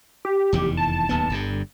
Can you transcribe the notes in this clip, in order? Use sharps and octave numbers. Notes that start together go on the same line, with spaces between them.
G4
F1 E2 D#3
A5
D1 D#2 B3
G1 G2 D3